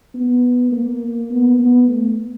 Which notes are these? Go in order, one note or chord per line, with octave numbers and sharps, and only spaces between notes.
B3
A#3
B3
B3
A3